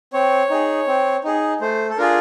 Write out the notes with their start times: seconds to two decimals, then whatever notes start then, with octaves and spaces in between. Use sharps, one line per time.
0.13 C4 C#5
0.50 D#4 G#4
0.87 C4
1.24 D#4 G#4
1.61 A3 C5
1.89 A4
1.97 D4 F4 G#4 A#4